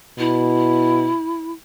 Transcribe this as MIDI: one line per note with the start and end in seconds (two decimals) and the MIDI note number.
0.19 1.12 47
0.19 1.52 64